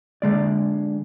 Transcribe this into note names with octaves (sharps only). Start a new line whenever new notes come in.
D3 G#3 D5